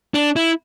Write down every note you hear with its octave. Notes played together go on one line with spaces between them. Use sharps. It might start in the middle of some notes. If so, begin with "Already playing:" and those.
D4
E4